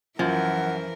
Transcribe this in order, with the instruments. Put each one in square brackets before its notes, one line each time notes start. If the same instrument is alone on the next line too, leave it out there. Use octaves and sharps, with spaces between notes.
[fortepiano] F#2 [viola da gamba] E3 A#4 [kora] F3 [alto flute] F#5